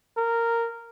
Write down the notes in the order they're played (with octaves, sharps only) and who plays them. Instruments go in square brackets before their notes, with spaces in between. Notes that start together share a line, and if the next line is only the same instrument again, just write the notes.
[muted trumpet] A#4